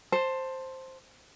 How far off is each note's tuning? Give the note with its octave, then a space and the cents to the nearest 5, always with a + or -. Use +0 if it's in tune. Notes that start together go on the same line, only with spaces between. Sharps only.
C5 +5 A5 +15